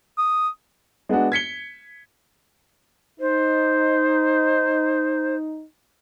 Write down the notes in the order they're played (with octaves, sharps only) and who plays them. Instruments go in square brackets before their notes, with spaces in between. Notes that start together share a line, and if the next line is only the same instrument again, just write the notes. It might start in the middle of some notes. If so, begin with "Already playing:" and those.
[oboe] D#6
[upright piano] G#3 B3 D4 F#4
G#6 B6 C#7 G7
[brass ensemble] D#4 [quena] C5